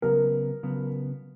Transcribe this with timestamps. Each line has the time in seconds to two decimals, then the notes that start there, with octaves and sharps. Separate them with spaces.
0.02 C#3 F#3 B3 A#4
0.63 C#3 F#3 B3